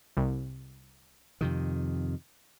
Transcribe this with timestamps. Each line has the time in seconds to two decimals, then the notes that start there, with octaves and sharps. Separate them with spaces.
0.17 C2
1.41 F2 C3 D#3